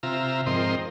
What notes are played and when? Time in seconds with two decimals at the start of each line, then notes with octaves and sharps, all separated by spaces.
0.03 C3 F4 E5 A#5
0.46 G#2 F3 C4 A#4 D#5 C6